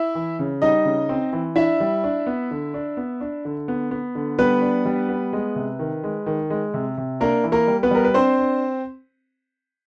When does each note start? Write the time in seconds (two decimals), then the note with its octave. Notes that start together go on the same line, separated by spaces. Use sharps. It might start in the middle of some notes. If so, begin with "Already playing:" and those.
Already playing: E4 E5
0.15 E3
0.39 C#3
0.62 G3 D#4 D#5
0.85 C#3
1.09 C4
1.33 E3
1.56 D4 E4 E5
1.80 G3
2.04 D4
2.27 B3
2.51 D3
2.74 D4
2.97 B3
3.21 D4
3.45 D3
3.68 B3
3.91 B3
4.15 D3
4.39 G3 B3 B4
4.62 D4
4.85 G3
5.09 B3
5.33 G#3
5.56 C3
5.79 D#3
6.04 G#3
6.26 D#3
6.50 G#3
6.74 C3
6.97 C3
7.20 A#3 D4 A#4
7.44 E3
7.52 A#3 A#4
7.67 G3
7.83 B3 B4
7.91 G3 A#4
8.05 B4
8.14 C4 D4 C5
8.39 D4